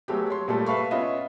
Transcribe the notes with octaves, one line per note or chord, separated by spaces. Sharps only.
F#3 G#3 A3 B3 G4
C#5 C6
A#2 G3 A3 A4
B4 E5 F5 B5 C#6
B3 C#4 F4 D#5 E5